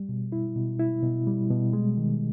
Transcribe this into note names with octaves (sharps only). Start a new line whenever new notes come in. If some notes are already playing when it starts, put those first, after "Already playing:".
Already playing: G3
B2
E4
B2
E4
B2
G3
B2
G#3
D#3